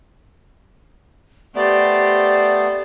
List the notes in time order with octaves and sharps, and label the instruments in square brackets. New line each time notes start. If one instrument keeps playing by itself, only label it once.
[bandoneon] A3 B3 [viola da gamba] G4 C5 [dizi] D5